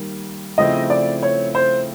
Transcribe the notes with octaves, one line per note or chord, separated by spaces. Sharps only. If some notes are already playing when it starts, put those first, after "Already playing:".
Already playing: D#3 G3 A#3
C#3 F3 A3 C4 E4 D#5
D5
C#5
C5